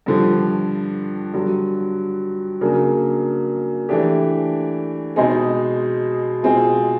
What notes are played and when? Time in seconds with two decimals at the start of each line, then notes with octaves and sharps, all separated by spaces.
0.06 G2 D3 F3
1.34 G2 D3 F#3
2.61 C#3 F#3 A#3 D4
3.89 E3 A3 D4 G4
5.16 B2 G#3 C4 D#4 G#4
6.43 B2 G#3 C4 F4 G#4